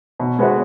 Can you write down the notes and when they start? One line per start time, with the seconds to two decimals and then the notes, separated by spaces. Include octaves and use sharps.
0.20 B2
0.39 G#3 B3 F#4 B4